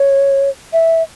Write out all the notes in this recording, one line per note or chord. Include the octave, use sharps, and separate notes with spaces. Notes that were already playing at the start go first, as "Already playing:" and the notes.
Already playing: C#5
E5